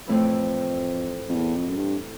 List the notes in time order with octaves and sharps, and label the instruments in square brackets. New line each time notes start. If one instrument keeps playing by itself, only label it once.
[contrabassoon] F2 [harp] A2 E3 A3 C4
[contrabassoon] F2
E2
F2
F#2
G2